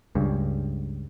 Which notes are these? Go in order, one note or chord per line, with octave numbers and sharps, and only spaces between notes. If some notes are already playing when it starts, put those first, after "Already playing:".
C#2 G2